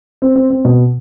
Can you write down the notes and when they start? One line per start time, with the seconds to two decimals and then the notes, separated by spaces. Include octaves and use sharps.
0.22 C4
0.36 C4
0.50 C4
0.65 B2